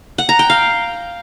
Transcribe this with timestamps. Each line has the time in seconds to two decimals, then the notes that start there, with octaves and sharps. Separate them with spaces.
0.18 F#5
0.29 A#5
0.39 G5
0.50 F5